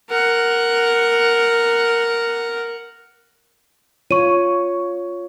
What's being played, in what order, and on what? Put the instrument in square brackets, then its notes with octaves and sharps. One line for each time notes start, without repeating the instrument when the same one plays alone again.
[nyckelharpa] A#4 F#5
[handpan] F4 C#5 [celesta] C#6 D#7